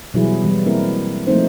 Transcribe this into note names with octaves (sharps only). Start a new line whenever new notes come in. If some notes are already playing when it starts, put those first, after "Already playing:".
B2 E3 F#3 G3 E4 G#4
E3 G3 G#3
A#3 C4 E4 A#4
F3 A3 A#3 C4 D#4 C5